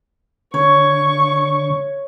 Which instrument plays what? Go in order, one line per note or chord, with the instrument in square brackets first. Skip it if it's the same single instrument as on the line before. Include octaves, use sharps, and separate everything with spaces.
[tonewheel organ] D3 [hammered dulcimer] C#5 [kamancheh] C#6